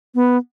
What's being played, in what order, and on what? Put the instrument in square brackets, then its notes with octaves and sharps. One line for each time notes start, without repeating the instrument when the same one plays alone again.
[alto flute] B3